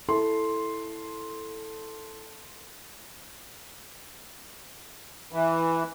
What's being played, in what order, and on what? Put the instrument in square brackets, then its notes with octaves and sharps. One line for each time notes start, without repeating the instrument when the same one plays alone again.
[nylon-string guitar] E4 [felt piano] A4 C6
[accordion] E3